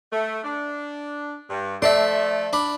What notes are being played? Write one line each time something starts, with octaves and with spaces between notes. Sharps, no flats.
A3
D4
G2
F3 A3 D5 E5 A5 C6
D4 B5